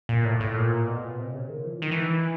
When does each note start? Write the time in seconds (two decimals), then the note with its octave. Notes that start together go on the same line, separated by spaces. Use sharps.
0.09 A#2
0.25 A2
0.40 A2
0.57 A#2
0.88 B2
1.19 C3
1.34 C#3
1.49 D#3
1.65 F3
1.74 E3
1.82 D#3
1.91 E3